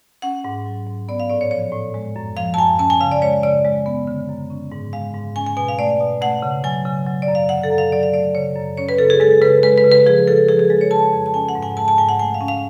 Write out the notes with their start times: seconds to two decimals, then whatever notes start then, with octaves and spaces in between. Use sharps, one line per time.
0.22 C#4 F#5
0.44 G#2
0.66 F#3
0.87 G#2
1.09 B3 D5
1.20 F5
1.29 A2 D5
1.41 C#5
1.51 F3 C#5
1.72 A2
1.94 G#3
2.16 F#2
2.37 F3 F5
2.54 A5
2.58 F#2 G#5
2.79 C#4 A5
2.90 G#5
3.01 C#3 F5
3.11 D5
3.22 G#3 C#5
3.43 C#3 D5
3.65 G#3
3.86 B3
4.07 D3
4.29 F#2
4.50 C#4
4.72 G#2
4.93 G#3 F5
5.14 G#2
5.36 C#4 G#5
5.47 G#5
5.57 B2 G#5
5.68 F5
5.79 A3 D5
6.00 B2
6.21 A3 F#5
6.43 C#3
6.64 F#3 G#5
6.85 C#3
7.06 F#3
7.22 D5
7.28 F#2
7.35 F5
7.49 D3 F#5
7.63 A4
7.71 F#2
7.78 F5
7.92 F#3 D5
8.03 F5
8.13 A3 D5
8.34 C#3 C#5
8.56 F#2
8.77 C#4 C#5
8.89 B4
8.98 C#3 A4
9.10 G#4
9.20 G#3 A4
9.42 C#3 B4
9.63 G#3 B4
9.78 B4
9.84 C#3
9.92 B4
10.06 F3 G#4
10.27 C#3 A4
10.48 F3 G#4
10.59 G#4
10.70 G#3 A4
10.81 C#5
10.91 C#3 A5
11.13 F2
11.26 A5
11.34 C#4 G#5
11.49 F#5
11.55 G#2
11.63 G#5
11.77 G#3 A5
11.88 A5
11.98 G#2 G#5
12.09 F#5
12.19 A3 G#5
12.34 F5
12.41 C#4
12.48 F5